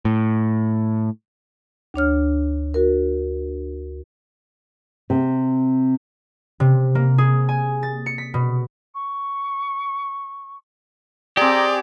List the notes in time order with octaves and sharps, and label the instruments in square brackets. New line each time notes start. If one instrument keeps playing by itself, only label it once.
[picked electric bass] A2
[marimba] D2 D4 C#5 F6
F#4 A#4
[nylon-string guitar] C3
[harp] C3
A#3
G#4
G#5
A6
C#7
B6
B2
[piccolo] C#6
[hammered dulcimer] C4 G#4 [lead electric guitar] G4 [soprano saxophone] D5 [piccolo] A#5